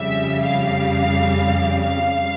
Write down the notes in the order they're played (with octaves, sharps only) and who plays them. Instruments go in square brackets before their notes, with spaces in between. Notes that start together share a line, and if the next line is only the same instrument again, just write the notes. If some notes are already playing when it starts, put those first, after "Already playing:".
Already playing: [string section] F2 C#3 G3 E5
F5
F5